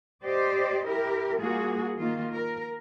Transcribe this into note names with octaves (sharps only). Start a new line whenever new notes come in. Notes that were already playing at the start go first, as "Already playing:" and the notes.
G4 C5 D5 D#5
E4 G4 A#4
G3 A#3 F4 F#4 G#4
D#3 A#3 F4
A#4